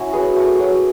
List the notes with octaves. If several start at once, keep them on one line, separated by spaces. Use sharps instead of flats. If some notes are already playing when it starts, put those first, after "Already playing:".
Already playing: C#4 E4 F#4
F#3 G#4 B4
A3
F#3